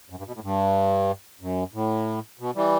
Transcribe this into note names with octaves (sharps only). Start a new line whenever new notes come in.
F#2
G2
B2
A2
G2
F#2
A2
B2
E3 G3